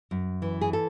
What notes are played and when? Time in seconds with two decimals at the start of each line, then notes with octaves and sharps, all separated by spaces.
0.11 F#2
0.42 E3
0.61 G#4
0.73 A4